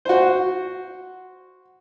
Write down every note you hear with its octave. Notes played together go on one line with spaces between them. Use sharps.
F#4 C5